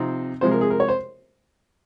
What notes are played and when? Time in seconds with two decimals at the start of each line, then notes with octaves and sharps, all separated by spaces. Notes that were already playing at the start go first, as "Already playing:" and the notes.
Already playing: C3 F3 C4 D#4
0.41 C3 F3 G#3 C5
0.51 A#4
0.61 G#4
0.70 A#4
0.80 C#5
0.89 C5